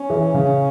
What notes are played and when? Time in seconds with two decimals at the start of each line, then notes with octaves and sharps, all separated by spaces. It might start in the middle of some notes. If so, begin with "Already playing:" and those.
Already playing: C#4
0.10 E3
0.34 C#3